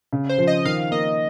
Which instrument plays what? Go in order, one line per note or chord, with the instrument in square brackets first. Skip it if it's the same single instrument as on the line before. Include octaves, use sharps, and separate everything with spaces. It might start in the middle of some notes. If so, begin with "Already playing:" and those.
[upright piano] C#3
[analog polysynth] C5
[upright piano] F3
[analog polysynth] D#5
[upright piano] D#3 [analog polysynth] F5
[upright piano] A#3 [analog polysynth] D#5